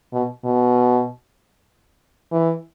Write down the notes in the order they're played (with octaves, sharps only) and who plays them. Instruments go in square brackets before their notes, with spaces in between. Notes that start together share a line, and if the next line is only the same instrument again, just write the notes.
[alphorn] B2
B2
E3